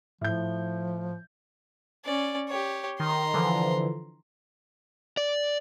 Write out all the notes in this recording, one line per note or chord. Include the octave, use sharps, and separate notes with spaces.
A2 F3 G6
C#4 D5
G4 C#5
D#3 A#5 C6
D3 E3 F3
D5